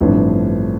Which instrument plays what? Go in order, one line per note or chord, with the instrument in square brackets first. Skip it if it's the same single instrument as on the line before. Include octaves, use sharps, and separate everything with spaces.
[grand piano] A1 G2 D3 F3 C4